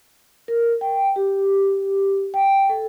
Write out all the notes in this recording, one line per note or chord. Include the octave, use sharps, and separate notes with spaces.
A#4
G5
G4
G5
A4